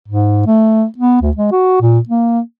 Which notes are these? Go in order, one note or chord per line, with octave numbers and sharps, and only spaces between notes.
G#2
A3
B3
D2
G#3
F#4
A#2
A#3